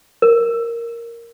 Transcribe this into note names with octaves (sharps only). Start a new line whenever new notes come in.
A#4